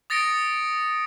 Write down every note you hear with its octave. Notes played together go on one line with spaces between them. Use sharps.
D#6 A6 A#6 C#7 D7